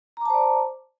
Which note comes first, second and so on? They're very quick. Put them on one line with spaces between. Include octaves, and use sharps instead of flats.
A#5 D6 A5 C5 D5